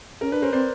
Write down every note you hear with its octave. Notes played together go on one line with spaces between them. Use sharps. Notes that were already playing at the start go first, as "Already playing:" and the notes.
C#4 A#4
D4 B4
C#4 A#4 C5
C4 C5 D5